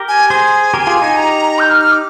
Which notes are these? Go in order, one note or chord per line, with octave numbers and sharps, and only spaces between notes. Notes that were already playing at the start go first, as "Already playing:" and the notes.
Already playing: G4 A#4
G#5
G#4 C5 G#5
G4 A#4
F4 G#4
D#4 G4
A#5
G6
F6
F6
D6